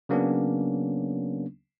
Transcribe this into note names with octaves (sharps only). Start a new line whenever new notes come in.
C#3 F#3 A#3 B3 C#4 D4